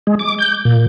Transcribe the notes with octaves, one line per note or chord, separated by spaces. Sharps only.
G#3
D6
G6
A#2